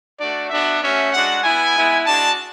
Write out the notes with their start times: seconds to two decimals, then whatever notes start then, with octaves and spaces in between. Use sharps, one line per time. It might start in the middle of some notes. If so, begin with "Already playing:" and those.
0.19 A3 D4 F#4 D5
0.50 B3 D4 F#4 E5
0.81 A3 C#4 F#4 E5
1.12 G#3 D4 F#4 F#5
1.43 B3 E4 G#5
1.74 G#3 B3 E4
2.05 G#3 D4 F#4 A5